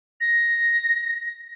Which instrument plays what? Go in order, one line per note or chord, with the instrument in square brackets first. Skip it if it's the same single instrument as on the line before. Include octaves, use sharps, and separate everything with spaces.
[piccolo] A#6